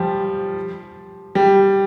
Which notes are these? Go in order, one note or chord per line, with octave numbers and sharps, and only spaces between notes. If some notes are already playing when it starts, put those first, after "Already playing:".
Already playing: F3 G3
G3